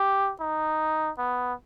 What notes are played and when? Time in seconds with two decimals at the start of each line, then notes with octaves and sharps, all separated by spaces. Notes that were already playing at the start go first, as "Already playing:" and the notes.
Already playing: G4
0.40 D#4
1.18 B3